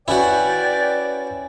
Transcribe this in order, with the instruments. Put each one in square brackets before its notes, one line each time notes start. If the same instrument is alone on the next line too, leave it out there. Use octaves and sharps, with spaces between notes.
[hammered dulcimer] C#4 G#5 [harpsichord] E4 F#4 [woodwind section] B4 G5 [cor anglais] D5